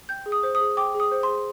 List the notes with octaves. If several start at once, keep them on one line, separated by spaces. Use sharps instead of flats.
G5 G6
G#4
D#6
C5
D#6
G#4
G5 D6
G#4
D#6
C5
G#4 C6